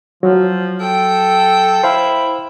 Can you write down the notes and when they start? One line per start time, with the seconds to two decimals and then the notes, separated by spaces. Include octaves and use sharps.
0.23 F3 F#3
0.81 A4 G5
1.83 E4 C5 F5